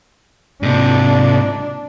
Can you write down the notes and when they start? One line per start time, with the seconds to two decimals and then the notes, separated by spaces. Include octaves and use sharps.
0.63 G#2 C3 D4